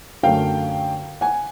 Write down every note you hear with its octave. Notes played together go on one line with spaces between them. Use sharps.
F#2 D3 F#3 A3 F5 G5
F#5 G#5